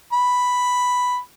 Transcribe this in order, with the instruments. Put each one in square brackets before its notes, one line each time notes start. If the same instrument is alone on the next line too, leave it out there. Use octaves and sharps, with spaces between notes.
[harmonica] B5